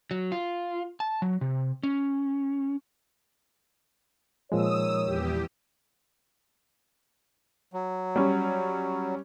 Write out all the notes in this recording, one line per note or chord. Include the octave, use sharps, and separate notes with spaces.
F#3
F4
A5
F#3
C3
C#4
A#2 D#3 F3 G#3 A#4 C#5 D#6 E6
E2 G4
F#3
G3 C#4